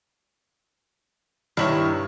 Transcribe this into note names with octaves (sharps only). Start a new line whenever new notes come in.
G2 D#3 E4 C#5